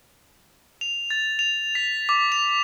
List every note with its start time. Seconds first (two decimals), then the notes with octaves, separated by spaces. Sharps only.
0.81 F7
1.11 A6
1.39 F7
1.75 B6
2.09 D6
2.32 F7